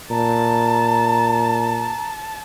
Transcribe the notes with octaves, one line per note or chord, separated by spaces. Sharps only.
A#2 A5 A#5